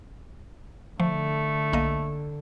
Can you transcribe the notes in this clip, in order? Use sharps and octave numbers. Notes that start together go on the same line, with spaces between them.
D3 F3 A3
B1 A#3 D#5